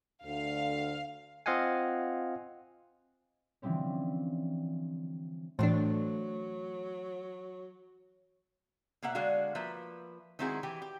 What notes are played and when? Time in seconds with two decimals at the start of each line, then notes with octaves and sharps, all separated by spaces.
0.24 D2 D3 F5
1.46 C4 F4 D#5 F5 F#5 G#5
3.62 D3 E3 F3 G3 C4 C#4
5.59 A2 E3 F#3 A3 C4 D4
9.03 B2 A#3 E5 F#5
9.15 D3 G#3 D4 F#4 F5
9.55 F3 A#3 B4 E5
10.39 D#3 G#3 C4 E4 F#4 G#4
10.63 E3 G4
10.82 G4